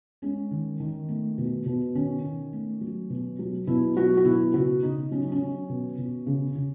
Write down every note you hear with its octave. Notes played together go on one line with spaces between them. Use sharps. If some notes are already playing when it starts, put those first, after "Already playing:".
G#3 C#4
D#3
D#3
A3
B2
B2
D#3 C#4
D#3
A3
F#3
B2
F#3
B2 E4
F#3 F#4
F#4
B2 E4
C#3 F#4
C#3 D#4
F#3 C#4
D#4
C#4
F#3
B2
B2
C#3
C#3